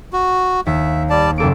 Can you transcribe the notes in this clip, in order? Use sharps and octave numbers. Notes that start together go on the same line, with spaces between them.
F#4
D#2 E5
G3 D5 A5
F#1 A#3 A4 D7